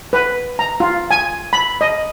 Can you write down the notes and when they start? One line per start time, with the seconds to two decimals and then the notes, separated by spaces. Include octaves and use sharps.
0.13 B4
0.59 A#5
0.80 F4
1.11 G#5
1.53 B5
1.81 D#5